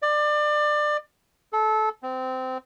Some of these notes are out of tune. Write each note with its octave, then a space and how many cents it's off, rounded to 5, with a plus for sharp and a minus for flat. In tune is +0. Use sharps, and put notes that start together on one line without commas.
D5 +25
A4 -20
C4 -20